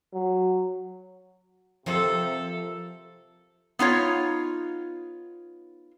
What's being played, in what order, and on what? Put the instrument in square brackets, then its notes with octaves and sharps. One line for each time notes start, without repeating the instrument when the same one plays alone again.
[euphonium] F#3
[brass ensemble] C3 [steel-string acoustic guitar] F3 A#4 C5 [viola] A4
[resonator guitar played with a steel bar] B3 D#4 F4 C#5